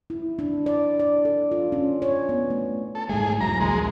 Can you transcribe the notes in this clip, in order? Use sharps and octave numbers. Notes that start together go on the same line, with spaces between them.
E4
D4
D5
D5
A4
F4
C#4
C#5
B3
A3
A4
G#2 G#3 A3 G#4
E1 C#2 F#3 A#5
A#1 D#2 G#3